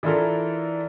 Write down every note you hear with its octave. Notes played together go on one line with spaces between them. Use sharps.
E3 D4 E4 F4 A4 A#4